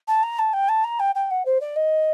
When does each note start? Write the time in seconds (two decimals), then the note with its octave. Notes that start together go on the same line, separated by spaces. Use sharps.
0.07 A5
0.23 A#5
0.38 A5
0.53 G5
0.68 A5
0.84 A#5
0.99 G5
1.15 G5
1.30 F#5
1.45 C5
1.60 D5
1.76 D#5